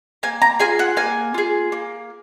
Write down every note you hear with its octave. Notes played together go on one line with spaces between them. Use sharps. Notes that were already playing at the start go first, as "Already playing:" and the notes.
A#3 G#5
A#5
F4 G#4 G#5
F#5
A#3 G#5
F4 G#4
A#3